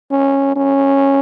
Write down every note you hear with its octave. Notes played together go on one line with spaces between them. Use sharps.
C#4
C#4